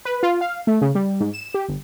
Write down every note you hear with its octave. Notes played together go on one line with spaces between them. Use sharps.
B4
F4
F5
A3
C#3
G3
G#2
E7
G4
G1